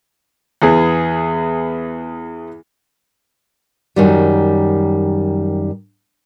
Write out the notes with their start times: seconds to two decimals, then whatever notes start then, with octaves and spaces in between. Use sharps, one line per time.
0.62 E2 B3 G#4
3.96 F#2 D#3 G3